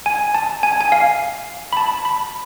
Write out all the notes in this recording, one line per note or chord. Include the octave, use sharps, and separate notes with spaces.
G#5
A5
G#5
G#5
F5
B5
A5
B5